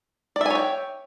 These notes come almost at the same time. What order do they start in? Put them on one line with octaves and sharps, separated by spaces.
D5 E5 G#5 C#5 G5